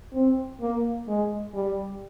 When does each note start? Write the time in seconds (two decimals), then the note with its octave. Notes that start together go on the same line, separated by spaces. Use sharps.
0.14 C4
0.61 A#3
1.08 G#3
1.54 G3